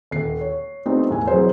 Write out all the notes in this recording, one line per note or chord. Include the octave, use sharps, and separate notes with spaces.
D#1 C7
C#5
A3 B3 C4 D4 D#4 G4
E2 A2 G#5
E3 F#3 C4 G#4 B4 C5